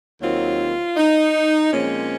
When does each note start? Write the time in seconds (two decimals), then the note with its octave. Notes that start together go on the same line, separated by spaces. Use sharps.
0.21 D#2 D#3 F#3 C4 F4
0.97 D#4
1.72 A#2 F3 G#3 C4 C#4